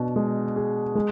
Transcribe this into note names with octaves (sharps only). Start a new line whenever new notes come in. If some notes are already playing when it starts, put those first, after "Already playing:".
Already playing: B2 D4
G#3
G#4
G#3